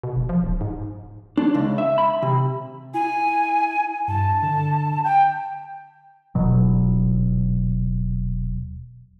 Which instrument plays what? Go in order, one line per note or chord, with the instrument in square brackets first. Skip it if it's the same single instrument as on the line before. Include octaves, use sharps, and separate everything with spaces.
[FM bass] B2
F#1
F3
D1
G#2
[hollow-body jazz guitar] D4
C#2
E5
B5
C3
[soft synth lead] E4 [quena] G#5
[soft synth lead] G2 [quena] A5
[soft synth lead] D3
[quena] G5 [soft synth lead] G6
[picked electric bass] D#1 B2 F#3